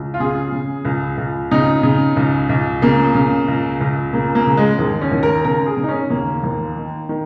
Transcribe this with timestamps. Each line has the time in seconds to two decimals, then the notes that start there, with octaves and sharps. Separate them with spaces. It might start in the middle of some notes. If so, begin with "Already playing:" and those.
Already playing: C#2
0.14 F4
0.20 C#3 G#4
0.52 C#3
0.85 C#2
1.18 C#2
1.51 C#3 D#4
1.83 C#3
2.16 C#2
2.49 C#2
2.82 C#3 A#3
3.15 C#3
3.48 C#2
3.81 C#2
4.13 C#3 A#3
4.35 A#3
4.46 C#3
4.57 G#3
4.79 D#2
5.01 C#4
5.12 D#2
5.23 A#4
5.44 C#3 A#4
5.66 G#4
5.77 C#3
5.84 D#4
5.88 C#4
6.10 D#2 A#3
6.44 D#2
6.76 D#3
7.09 D#3